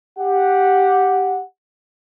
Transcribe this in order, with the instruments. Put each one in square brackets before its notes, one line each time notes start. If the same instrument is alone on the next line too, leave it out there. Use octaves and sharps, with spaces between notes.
[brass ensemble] G4 F#5